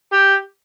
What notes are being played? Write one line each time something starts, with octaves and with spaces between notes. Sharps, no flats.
G4